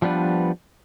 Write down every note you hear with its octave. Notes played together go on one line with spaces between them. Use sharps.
F3 G3 B3 D4 B4